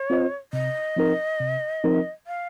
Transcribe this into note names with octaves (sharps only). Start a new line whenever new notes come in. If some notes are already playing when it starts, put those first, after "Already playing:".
Already playing: C#5
C4 F4 C5 D#5
C3 D#5
F3 C4 D#4 A#4
C3
F3 C4 D#4 A#4
F5